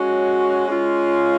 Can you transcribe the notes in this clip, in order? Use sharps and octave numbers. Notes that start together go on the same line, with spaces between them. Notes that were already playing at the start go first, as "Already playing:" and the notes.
Already playing: G#3 C#4 F#4 C#5
G#3 C#4 F4